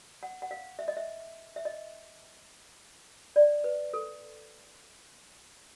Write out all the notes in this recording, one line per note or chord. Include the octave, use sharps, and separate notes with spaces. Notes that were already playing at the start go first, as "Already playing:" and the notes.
F#5
F#5
F5
E5
D#5
E5
E5
D#5
D5
B4
A4